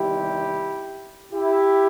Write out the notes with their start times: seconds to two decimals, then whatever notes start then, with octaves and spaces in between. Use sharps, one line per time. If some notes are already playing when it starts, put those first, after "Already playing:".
Already playing: E2 C3 D#3 G3 E4 G4
1.33 E4 G4